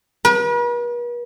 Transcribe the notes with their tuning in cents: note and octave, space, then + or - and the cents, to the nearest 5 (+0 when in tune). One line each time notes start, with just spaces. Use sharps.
B4 -45